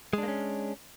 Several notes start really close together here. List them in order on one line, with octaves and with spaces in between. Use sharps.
G#3 D4 A#3 C#4